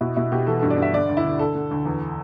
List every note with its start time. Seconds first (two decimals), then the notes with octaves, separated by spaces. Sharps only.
0.01 B2 E4
0.16 B2 E4
0.32 B2 G4
0.47 E3 A4
0.60 G2 A4
0.71 D5
0.78 G2 E5
0.93 D3 D5
1.09 D2
1.17 E4
1.25 D3
1.39 D3 A4
1.55 D3
1.71 D2
1.85 E2